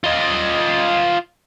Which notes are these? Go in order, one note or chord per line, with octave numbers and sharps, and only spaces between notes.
F4 D#5